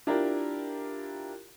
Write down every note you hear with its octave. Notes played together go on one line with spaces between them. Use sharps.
D4 E4 F4 G4 A#4